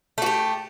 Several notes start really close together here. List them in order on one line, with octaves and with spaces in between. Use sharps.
A3 F#4 G4